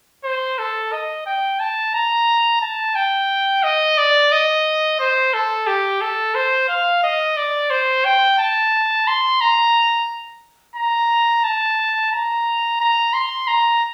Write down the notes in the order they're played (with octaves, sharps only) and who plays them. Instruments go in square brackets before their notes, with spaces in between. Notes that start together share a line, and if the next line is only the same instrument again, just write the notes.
[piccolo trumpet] C5
A4
D#5
G5
A5
A#5
A5
G5
D#5
D5
D#5
C5
A4
G4
A4
C5
F5
D#5
D5
C5
G5
A5
C6
A#5
A#5
A5
A#5
A#5
C6
A#5